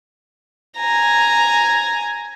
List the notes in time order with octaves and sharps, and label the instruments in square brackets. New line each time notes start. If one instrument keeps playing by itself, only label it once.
[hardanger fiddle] G#5 A#5